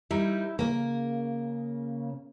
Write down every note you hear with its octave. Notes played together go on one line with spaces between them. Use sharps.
G3 D#4 E4 A#4
C#3 A#3 A#4